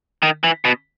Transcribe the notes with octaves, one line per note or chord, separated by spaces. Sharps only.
D#3
E3
B2